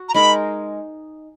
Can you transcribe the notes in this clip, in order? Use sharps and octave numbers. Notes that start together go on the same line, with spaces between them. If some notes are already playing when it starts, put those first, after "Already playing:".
Already playing: F#4
A#5
G#3 D#4 A#4 B5